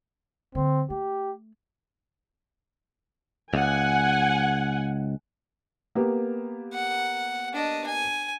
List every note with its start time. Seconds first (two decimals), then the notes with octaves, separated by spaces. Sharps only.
0.55 D3 F#3 C4
0.90 A3 G4
3.54 C#2 F#5 G#5
5.95 A#3 B3 G4
6.73 F#5
7.54 D4 D#5
7.86 G#5